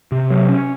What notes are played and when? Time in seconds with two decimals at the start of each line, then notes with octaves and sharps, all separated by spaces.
0.12 C3
0.30 F#3
0.49 C#4